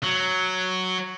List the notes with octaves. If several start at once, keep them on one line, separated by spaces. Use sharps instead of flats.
F#3